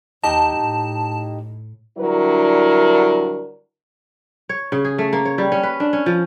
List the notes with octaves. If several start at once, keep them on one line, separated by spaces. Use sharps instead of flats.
D#2 D#4 G4 D#5 A5
A2
G2 D3 F#3 E4 A#4
C#5
C#3
G#4
A3
A#3
C#5
G3
C#4
B4
D4
C#4
F3